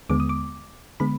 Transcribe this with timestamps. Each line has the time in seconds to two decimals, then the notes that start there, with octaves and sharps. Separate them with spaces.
0.09 D#2 D3 G#3 B3 D6
0.20 D#6
0.29 D6
1.00 D3 G#3 B3 B5